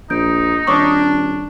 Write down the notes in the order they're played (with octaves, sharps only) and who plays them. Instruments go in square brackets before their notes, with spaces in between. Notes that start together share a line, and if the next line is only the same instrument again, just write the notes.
[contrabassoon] A#1 [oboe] D#4 [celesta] G6 D7
[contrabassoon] D#1 [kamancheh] D4 [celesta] C#5 C#6 D6